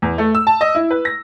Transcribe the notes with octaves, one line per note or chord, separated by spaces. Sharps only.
E2
A3
E6
A5
D#5
E4
B4
A#6